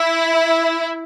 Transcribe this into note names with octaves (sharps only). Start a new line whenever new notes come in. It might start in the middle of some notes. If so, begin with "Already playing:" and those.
Already playing: E4